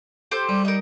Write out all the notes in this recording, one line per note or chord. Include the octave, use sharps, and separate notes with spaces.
G4 A4 C5
G3
D#4 A#4